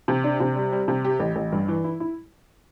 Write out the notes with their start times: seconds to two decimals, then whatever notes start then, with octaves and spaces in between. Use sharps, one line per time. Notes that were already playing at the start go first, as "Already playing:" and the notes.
0.08 C3
0.24 D4
0.40 C3
0.56 G3
0.72 G3
0.88 C3
1.05 G4
1.20 A1
1.36 A1
1.52 G2
1.68 E3
1.84 E4
2.00 E4